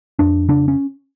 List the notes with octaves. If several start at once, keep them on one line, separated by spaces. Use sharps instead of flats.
F2 D4
C#3 D4
C#4